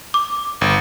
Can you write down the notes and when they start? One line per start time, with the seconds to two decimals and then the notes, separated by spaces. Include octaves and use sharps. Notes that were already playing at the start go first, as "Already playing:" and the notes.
0.14 D6
0.61 G1